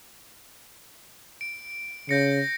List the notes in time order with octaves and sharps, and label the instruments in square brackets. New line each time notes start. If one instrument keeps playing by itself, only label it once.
[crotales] D7
[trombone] C#3 [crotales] G6 A#6 C#7